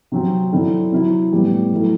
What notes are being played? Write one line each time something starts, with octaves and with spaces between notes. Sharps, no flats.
C3 F#3 C4
D3 F#3 C4 E4
C3 F#3 C4 E4
A2 G3 B3
F#3 A3 E4